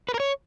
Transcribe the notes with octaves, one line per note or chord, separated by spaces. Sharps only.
B4
A#4
C#5